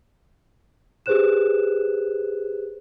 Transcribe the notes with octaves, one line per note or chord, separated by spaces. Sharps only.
G4 G#4 B4 C5 F#6 E7